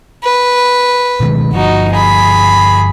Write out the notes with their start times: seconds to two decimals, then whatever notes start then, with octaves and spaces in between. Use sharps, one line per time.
0.24 B4
1.20 B2 D#3 G#3
1.53 G1 F3 D#4 F#4
1.92 G#4 B5